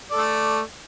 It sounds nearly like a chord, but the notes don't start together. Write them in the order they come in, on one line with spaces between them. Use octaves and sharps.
D5 A4 A3